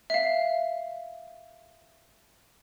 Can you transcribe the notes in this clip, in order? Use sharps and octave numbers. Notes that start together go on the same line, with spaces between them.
E5 F5